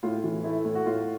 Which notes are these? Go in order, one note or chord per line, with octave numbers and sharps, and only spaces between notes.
A2 F4
E3
A3 E4
A2
F#4
A2 F4